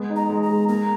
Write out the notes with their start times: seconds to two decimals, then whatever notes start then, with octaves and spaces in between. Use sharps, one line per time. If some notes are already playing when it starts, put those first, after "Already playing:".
Already playing: G#3 B3
0.10 D#4
0.16 A#5
0.29 G#3
0.43 A#5
0.49 G#3
0.69 A#3 A#5